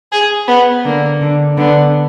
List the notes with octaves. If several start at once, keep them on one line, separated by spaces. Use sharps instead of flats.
G#4
B3
D3 A#3
D3
D3 B3